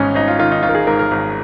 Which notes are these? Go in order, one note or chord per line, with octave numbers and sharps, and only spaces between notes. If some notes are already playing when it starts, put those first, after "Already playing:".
Already playing: G#1 G#2 C#4 D#4
G#1 D#4
F4
D#3 F4
D#4
G#1 F4
A#4
G#4
G#2 A#4
A#4
G#1